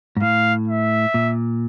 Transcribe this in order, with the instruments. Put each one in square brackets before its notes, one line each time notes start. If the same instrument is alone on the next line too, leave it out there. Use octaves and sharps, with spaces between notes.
[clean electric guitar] G#2
[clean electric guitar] A2 [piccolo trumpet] F5
[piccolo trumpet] E5
[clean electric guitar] A#2